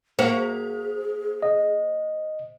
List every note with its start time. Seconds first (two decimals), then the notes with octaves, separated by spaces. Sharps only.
0.19 A#3 F#4 G#4 C5
1.43 D#5